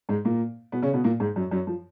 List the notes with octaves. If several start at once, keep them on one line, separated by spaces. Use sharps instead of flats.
G#2 G#3
A#2 A#3
B2 B3
C#3 C#4
B2 B3
A#2 A#3
G#2 G#3
F#2 F#3
F#2 F#3
F3